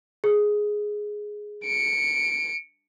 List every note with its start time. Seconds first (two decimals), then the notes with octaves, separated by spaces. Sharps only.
0.24 G#4
1.65 C#7 D7